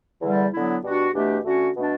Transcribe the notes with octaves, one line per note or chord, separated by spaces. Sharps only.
E2 D3 G3
D3 F#3 B3 E4
B2 G3 D4 F#4
E2 B2 A3 D4 G4
D3 A3 C#4 F#4
B2 A3 D4